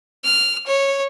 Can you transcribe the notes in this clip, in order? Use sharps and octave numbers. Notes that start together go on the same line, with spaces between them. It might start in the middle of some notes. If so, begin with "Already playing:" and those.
F6
C#5